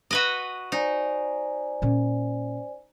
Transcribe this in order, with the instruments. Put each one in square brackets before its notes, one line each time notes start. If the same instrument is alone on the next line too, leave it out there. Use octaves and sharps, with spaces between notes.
[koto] F#4 B4 D#5
[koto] D#4 [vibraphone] C5 D5 G#5
[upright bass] A#2 C#4